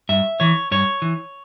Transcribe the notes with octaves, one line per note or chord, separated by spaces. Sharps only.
G2 E5
E3 C#5
G2 C#5
E3